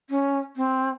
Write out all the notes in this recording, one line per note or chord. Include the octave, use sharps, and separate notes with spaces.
C#4
C4